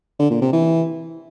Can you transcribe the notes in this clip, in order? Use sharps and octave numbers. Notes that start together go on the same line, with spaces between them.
D3
A#2
C3
E3